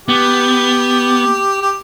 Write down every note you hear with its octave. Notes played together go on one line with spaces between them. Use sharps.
B3 G4
G4